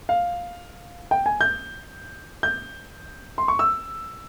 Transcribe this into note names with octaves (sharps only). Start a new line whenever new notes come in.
F5
G5
G#5
G6
G6
C6
C#6
E6